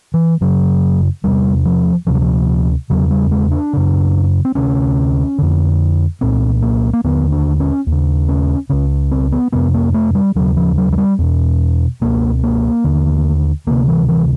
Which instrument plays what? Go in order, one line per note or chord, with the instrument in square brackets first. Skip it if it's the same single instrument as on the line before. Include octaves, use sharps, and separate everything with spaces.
[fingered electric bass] E3
F#2 C#3 F#3
E2 C3 G3
F3
D2 C3 F3
F#3
F3
E2 C#3 F#3
G3
G#3
D4
F#2 C#3
C4
D2 C3 C#4
F2 D3
C2 A#2 C4
A#3
A#3
D#2 D3 B3
D4
C#4
D#2
C#3
C#4
C#2 C#3 C#4
C4
B3
F2 C3 B3
A#3
A3
G3
D#2 C#3 F#3
F3
F#3
F#3
G3
E2 B2
C#2 B2 A#3
A#3
D#2 D3
D2 C3 A#3
E3
E3